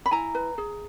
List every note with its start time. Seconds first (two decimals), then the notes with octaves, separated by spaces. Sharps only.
0.06 B5
0.11 E4 G#5 A#5
0.35 B4
0.58 G#4